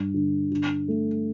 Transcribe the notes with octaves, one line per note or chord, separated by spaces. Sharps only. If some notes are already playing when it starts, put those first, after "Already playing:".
Already playing: G2
D3
D3
A3